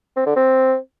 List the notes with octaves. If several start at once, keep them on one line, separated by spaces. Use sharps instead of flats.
C4
D3
C4